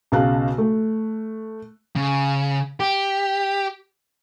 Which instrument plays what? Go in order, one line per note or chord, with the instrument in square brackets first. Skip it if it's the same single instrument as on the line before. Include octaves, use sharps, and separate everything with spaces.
[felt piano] B1 C#3 F5 A5 F#6
A3
[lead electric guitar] C#3
G4